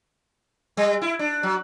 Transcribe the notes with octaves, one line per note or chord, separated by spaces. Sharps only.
G3
E4
D4
F#3